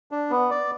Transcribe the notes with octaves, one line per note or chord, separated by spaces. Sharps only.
D4
B3
D5